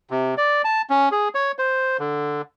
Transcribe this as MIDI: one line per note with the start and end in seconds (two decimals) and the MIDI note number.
0.10 0.34 48
0.38 0.62 74
0.65 0.82 81
0.90 1.09 61
1.12 1.28 68
1.35 1.52 73
1.59 1.97 72
1.99 2.42 50